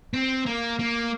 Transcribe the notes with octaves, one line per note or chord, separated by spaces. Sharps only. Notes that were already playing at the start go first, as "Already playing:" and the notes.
C4
A#3
A#3